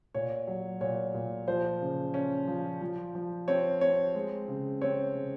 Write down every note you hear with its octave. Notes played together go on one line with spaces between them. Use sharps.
A#2 C#5
F#3
A#2 C#5
A#2
F3 C5
C#3
C#4
F3
F3
F3
C4 C#5
C4 C#5
G#3
C#3
C4 C#5
C#3